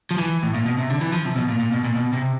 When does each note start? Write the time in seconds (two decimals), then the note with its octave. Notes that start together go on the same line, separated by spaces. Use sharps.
0.11 F3
0.18 E3
0.43 A2
0.54 A#2
0.65 B2
0.78 C3
0.90 D3
1.01 E3
1.12 F3
1.25 C3
1.36 B2
1.48 A#2
1.59 A#2
1.72 B2
1.84 A#2
1.95 B2
2.13 C3